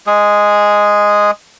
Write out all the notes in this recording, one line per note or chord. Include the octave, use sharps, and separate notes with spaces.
G#3 G#4